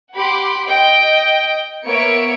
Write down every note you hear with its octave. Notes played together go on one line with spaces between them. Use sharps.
G4 F#5 B5 C6 D6
D#5 G5
A#3 B3 C#5 E5 C#7 D7